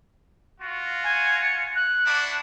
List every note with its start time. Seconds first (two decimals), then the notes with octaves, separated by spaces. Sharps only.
0.61 F4 F#4
1.04 G#5
1.41 C#7
1.76 F#6
2.06 D4 E4 F#4